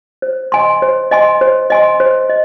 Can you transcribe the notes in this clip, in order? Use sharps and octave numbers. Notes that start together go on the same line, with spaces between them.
C5
D#5 G#5 C6
C5
D#5 G#5 C6
C5
D#5 G#5 C6
C5
D#5